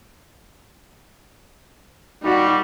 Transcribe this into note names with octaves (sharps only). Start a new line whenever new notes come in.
A#2 G3 D#4 F#4